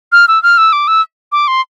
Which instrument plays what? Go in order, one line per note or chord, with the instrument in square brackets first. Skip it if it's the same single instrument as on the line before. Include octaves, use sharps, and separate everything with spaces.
[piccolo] F6
E6
F6
E6
D6
E6
D6
C6